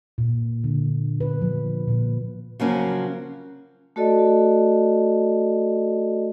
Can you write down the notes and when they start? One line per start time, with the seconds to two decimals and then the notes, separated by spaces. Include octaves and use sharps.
0.18 A#2
0.64 D3
1.21 B4
1.42 F3
1.88 A#2
2.60 C#3 F3 F#3 A#3 C#4
3.96 A3 F#4 A4 D5 D#5